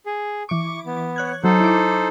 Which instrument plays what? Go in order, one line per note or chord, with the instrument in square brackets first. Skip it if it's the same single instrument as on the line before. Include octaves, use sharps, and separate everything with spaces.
[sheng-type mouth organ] G#4
[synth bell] E3 D6 [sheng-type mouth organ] C#6
[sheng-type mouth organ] B3
[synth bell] C#5 F#6 G#6
[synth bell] F#3 [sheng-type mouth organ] D#4 A4 C5
[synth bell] E4 D6